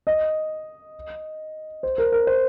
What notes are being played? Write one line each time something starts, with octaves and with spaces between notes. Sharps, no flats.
D#5
C5
A#4
A#4
C5